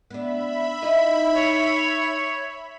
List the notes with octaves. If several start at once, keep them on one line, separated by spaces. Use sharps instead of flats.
B3 D4 E5 B5
D#4 E4 D#5
C#5